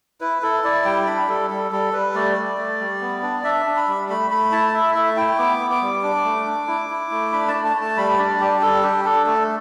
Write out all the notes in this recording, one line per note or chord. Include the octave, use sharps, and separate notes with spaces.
E4 B4
E4 A4
E4 D5
G3 G5
D4 B5
G3 A4
G3 A4
G3 A4
G3 B4
A3 D5
A3
A3
G3
B3
D4
D4 E5
D4
B5
G3
A3 B5
A3 B5
E4 A5
E4 E5
A3 E5
E4 G5
B3 D6
B3
D6
G3
D4
A3
D4
E4
E4
A3
D4 B5
A5
A3
A5
A3
A5
G3 B5
D4 D5
G3 G4
G3 A4
D4 G4
D4 A4
A3 A4